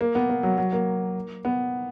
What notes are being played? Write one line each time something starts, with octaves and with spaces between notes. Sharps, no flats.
A#3
B3
A#3
F#3
F#3
A#3
B3